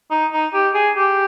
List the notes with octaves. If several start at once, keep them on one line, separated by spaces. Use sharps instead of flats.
D#4
D#4
G4
G#4
G4